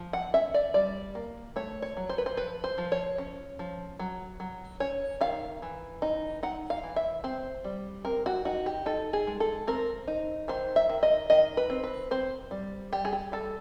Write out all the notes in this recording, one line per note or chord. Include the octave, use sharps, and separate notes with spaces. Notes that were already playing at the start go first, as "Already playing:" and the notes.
Already playing: F3
F#5
C#4 E5
D5
G3 D5
A#3
A3 C#5
C#5
F#3
C5
B4
C5
F3 B4
C5
F3
C#5
C#4
F3
F#3
F#3
C#4 C#5
D#3 F5
E3
D#4
D#4 F#5
F5
E3
E5
C4 C5
G3
C4 A#4
F#4
D#4 F#4
G4
D#4 A4
G#4
G#3
A4
C4 A#4
D#4
D#3 C5
E5
D#3
D#5
D#3 D#5
B4
C4
B4
C4 C5
G3
G3 G4
G#4
G4
G3 A4